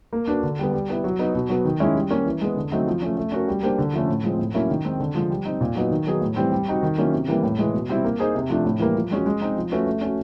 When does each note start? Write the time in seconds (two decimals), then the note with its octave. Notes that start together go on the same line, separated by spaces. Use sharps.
0.13 A#3
0.27 D4 F#4 B4
0.43 D3
0.59 G3 B3
0.73 G3
0.89 B3 E4
1.04 F#3
1.19 B3 D#4
1.35 B2
1.49 F#3 B3
1.65 D#3
1.80 G#3 C#4 E4
1.95 G3
2.10 A#3 C#4
2.26 E3
2.41 G#3 B3
2.56 D3
2.72 F#3 A3 C4 D#4
2.87 F3
3.02 A3 C#4
3.17 A3
3.32 C#4 F#4 A#4
3.48 G3
3.63 A#3 D4 G4 C5
3.78 D3
3.93 F3 A3 C#4
4.08 A2
4.24 F3 G#3 C4
4.39 A2
4.54 F#3 A#3 C#4 E4
4.70 D#3
4.85 G#3 C4 D#4
5.00 D3
5.15 F3 G#3
5.30 G3
5.46 C4 D#4
5.61 A#2
5.75 F#3 B3 D#4
5.91 D#3
6.07 F#3 B3 D#4 G#4
6.21 A2
6.36 E3 G3 C4
6.52 G3
6.67 C4 D#4 F#4
6.82 D#3
6.98 F#3 A#3 C#4 E4
7.13 C3
7.28 E3 G3 A#3
7.43 A2
7.59 E3 G#3
7.74 B2
7.89 G3 C4 E4
8.04 A#3
8.20 D#4 G#4 C5
8.35 C3
8.50 F3 A3 D4
8.65 A2
8.79 E3 G3 A#3
8.95 F3
9.11 G#3 C#4 F#4
9.26 G#3
9.41 C4 D#4
9.56 F3
9.72 A3 C#4 F#4 B4
9.87 A3
10.01 C#4
10.06 F#4